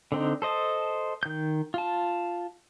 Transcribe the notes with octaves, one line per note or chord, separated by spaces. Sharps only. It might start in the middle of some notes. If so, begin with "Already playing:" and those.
D3 C4 D#4
A4 C5 D#5 A5
D#3 G6
F4 A5